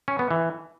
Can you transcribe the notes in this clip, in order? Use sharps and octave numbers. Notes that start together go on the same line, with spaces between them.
C#4
B3
E3